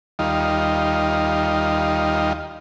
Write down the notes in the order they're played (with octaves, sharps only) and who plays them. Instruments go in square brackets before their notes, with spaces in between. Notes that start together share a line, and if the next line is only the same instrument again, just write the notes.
[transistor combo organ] D#2 G3 D#4 F4